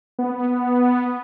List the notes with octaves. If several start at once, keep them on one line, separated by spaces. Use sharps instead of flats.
B3